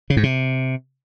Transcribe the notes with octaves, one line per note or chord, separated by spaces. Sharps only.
C#3
G#2
C3